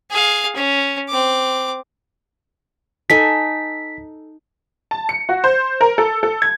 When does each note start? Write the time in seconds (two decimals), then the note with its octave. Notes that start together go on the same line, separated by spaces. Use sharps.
0.11 G#4 F5
0.56 C#4
1.09 C4 D6
3.10 D#4 A4 G#5 B6
4.91 A5
5.09 C#7
5.29 F#4
5.44 C5
5.81 A#4
5.98 A4
6.23 A4
6.42 G#6